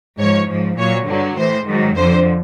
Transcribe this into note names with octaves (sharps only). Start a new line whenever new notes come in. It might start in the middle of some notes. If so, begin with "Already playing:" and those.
G#2 F3 C#5
G#2 F3
A#2 F#3 C#5
G2 D3 F#3
A2 E3 C5
G#2 D#3 F#3
F2 D3 F3 C5